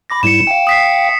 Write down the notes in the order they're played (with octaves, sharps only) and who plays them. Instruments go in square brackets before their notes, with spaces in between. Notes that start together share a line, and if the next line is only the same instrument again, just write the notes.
[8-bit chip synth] B5 D6 A#6
[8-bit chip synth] G#2 G3 E4 [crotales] C#7 E7
[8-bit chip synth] F5 G5
[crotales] D#6 B6 C7